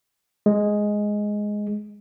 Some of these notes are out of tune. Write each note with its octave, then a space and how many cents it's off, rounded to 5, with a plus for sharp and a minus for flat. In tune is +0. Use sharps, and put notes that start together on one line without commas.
G#3 +5